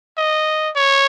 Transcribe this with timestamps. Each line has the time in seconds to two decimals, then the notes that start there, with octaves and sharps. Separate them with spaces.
0.17 D#5
0.76 C#5